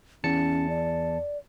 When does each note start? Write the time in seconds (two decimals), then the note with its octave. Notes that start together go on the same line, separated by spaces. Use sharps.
0.24 E2 C#4 A5 C#7
0.70 D5